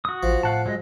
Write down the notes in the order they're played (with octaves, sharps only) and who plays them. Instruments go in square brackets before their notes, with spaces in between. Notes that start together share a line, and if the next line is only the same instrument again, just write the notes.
[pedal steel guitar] F#4 D#6
[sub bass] A1 [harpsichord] F3
[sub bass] A2 [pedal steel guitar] F5 F#5 A5
[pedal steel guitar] F#3 G#3 D#5